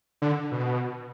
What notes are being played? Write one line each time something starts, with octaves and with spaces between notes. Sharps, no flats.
D3
B2